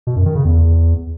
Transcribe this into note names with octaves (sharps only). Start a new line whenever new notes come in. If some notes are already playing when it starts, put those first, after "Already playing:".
B2
F#2
D#3
C#3
E2